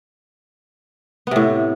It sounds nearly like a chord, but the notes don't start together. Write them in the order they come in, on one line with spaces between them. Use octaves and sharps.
B3 C3 A2